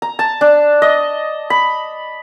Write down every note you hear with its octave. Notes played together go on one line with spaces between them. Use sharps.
A#5
A5
D4
D#5
B5